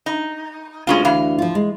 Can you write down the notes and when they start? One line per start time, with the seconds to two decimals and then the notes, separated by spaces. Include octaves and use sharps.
0.06 D#4
0.87 D2 G#3 C#4 F4
1.05 E3 F5
1.38 F3 F4
1.55 G#3